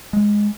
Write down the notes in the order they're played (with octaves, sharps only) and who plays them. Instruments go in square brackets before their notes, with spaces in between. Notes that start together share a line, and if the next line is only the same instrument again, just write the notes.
[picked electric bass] G#3